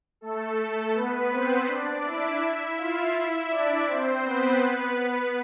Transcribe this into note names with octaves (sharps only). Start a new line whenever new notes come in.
A3 A4
A3 A4
B3 B4
C4 C5
D4 D5
E4 E5
E4 E5
F4 F5
E4 E5
D4 D5
C4 C5
B3 B4
B3 B4